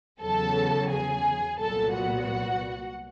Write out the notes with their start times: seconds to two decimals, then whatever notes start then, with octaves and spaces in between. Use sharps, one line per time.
0.21 E2 C#3 F#3 A4 A5
0.90 G#4 G#5
1.59 C2 A#2 F#3 B3 A4 A5
1.94 F#4 F#5